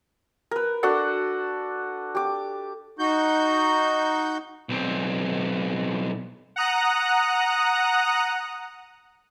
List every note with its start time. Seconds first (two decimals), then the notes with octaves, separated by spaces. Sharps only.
0.51 A#4 B4
0.83 D4 F#4 A4 F#5
2.15 G4 D6
2.99 D#4 F#4 G6
4.69 B1 C4
6.56 F#5 A#5 D#6 F#6